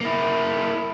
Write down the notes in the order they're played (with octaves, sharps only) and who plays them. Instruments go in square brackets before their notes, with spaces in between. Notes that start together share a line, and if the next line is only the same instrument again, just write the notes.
[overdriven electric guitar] A#3 E4